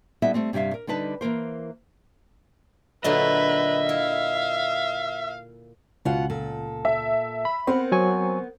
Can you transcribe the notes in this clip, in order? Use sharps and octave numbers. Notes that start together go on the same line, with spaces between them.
G3 B3 E4 A4 D#5 E5
G3 A3 C4
G2 C3 G3 E5 F5
A#4
D3 G3 D#4 B4 A5
E3 A#3 A#4 C5
A#2 D3 F#3 B4 D#5 E5
E4 F5
C#2 B2 F4 F#5
A#2 A4
E5
B5
B3 C4 A#4 F#5
F#3 G#5 C#6